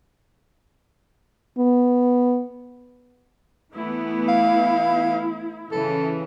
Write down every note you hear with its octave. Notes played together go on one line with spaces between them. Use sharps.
B3
E3 A3 B3 E4
F5
C#3 E3 A4